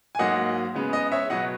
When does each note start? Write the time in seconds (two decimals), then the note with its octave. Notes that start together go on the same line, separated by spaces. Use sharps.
0.15 G#5
0.19 G#2 F#3 A#3 D#5 F#5
0.75 C#3 G#3 B3
0.93 D#5
1.12 C#5 E5
1.30 B2 F#3 B3 D#5 F#5